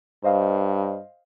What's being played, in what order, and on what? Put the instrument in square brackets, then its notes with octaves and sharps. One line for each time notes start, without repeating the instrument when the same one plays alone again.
[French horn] G2 [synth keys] C5 D#5 F5